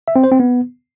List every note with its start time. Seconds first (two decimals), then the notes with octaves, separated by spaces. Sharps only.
0.08 E5
0.16 C4
0.24 C5
0.32 C4
0.40 B3